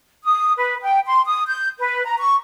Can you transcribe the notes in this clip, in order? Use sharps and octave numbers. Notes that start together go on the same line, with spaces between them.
D#6
B4
G5
C6
D#6
G6
B4
A#5
C#6